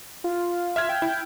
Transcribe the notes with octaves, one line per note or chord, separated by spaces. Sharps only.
F4
E5 F6 G#6
G5
E4